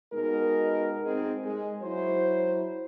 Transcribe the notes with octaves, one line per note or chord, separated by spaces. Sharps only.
B2 G#3 D#4 A#4
G#3 C4 D#4 G#4
G#3
F#3 E4 C5